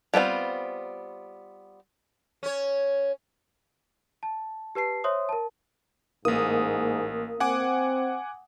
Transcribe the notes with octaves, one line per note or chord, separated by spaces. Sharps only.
G3 B3 C4 F4
C#4 C#5
A5
G4 B4 A5 C7
C5 C#5 E5 C6 D#6
A#4 A5
A1 G#2 A#3 D#6
C4 F#5 G#5 D6